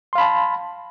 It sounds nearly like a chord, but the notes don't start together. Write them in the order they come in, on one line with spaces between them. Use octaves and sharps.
C6 F5 B5 A5